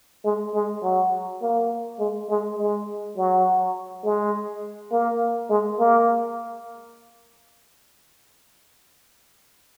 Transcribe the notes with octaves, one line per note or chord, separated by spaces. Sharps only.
G#3
G#3
F#3
A#3
G#3
G#3
G#3
F#3
G#3
A#3
G#3
A#3